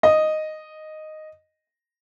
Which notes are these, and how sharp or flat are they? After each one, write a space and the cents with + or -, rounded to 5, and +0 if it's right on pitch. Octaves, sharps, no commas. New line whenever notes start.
D#5 -5